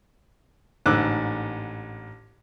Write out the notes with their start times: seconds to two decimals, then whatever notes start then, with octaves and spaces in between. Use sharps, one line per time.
0.86 A1 G#2 D3 D6 E6 F#6